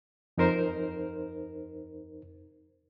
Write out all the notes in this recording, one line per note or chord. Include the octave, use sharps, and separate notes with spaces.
F2 D#4 A#4 C5